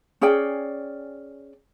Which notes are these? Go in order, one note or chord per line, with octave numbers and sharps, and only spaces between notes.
C#4 G#4 D5 G5